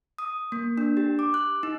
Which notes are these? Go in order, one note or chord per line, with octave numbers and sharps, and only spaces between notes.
D#6
A#3
D4
G4
D6
F#6
D#4